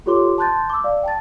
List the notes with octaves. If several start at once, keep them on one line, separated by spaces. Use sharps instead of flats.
F4 G4 A4 C#5 C6 D6
A5 C6 F#6 G6 A6
D6 E6
D5 F5
G5 A5 A6